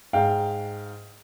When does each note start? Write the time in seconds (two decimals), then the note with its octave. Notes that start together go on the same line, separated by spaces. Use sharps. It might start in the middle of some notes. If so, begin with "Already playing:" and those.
0.13 G#2 F5 G5